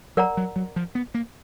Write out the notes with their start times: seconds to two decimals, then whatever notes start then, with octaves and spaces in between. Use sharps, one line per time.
0.17 F#3 A#4 D5 F#5 A#5
0.37 F#3
0.56 F#3
0.76 F3
0.95 B3
1.14 A#3